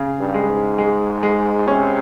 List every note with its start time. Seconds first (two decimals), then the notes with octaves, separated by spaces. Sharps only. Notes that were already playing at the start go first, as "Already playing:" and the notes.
Already playing: C#3
0.19 G2
0.34 G#3
0.49 G#2
0.78 G#3
1.23 G#3
1.67 C3 C#4